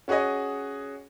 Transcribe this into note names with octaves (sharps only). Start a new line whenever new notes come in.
C#4 F#4 G#4 C#5 D#5